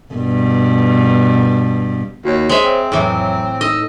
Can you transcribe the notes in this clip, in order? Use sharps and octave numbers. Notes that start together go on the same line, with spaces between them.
G2 B2
D#2 F#4 C#5
G#3 C5 C#5 E5
C4
F2 A2 E3 F#3
D#4 A4 D#5 E6